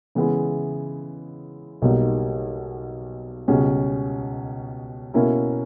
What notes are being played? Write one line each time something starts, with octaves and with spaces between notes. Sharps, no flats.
C#3 E3 G#3 B3 E4
B1 B2 G3 A#3 D#4
C#2 B2 G3 C#4 G#4
B2 A#3 C#4 E4 A#4